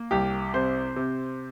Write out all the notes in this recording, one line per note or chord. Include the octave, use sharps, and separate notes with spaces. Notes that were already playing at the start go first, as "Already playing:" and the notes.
Already playing: A#3
C2 G4
C3 C5
C3